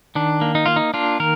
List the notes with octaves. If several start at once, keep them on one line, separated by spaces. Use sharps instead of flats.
D#3 D4
A#3
D#4
A#3 F4
D#4
A#3 D4 F4
D#3 A#4